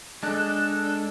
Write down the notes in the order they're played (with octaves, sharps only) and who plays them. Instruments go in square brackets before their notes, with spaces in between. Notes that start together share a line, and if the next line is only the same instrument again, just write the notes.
[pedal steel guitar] G#3 D4 [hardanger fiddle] A4 [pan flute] F#6